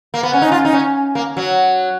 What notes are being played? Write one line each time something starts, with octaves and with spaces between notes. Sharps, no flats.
A#3
B3
C#4
D#4
F4
D#4
C#4
A#3
F#3